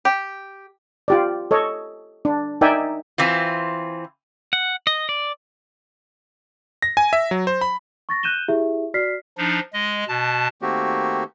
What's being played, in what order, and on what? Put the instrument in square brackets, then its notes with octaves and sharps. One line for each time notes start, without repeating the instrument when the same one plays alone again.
[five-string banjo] G4
[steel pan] F4 G4 D5
A4 C#5 D#5
D4
D#4 A#4 D5 E5 G5 G#5
[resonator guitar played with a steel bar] E3 C4 F4
[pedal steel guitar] F#5
D#5
D5
[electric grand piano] A#6
G#5
E5
F#3
C5
B5
[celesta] C#6 A6 A#6
F#6 G6 D#7 E7 G7
E4 G4 G#4 E5
F#4 D5 F6 B6 C7
[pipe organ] F3 D4 D#4
G#3 D#5
B2 A5
[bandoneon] D#3 A3 A#3 C4 F#4 G4